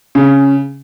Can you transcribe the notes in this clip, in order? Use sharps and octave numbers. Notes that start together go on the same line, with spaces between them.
C#3